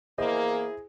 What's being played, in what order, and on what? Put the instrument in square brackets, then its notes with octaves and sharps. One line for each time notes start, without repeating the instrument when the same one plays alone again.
[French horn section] E2 A#3 [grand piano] E4 C5 D#5 [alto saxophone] G#4